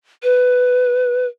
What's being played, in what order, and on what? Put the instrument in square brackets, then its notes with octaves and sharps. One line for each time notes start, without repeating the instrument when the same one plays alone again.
[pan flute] B4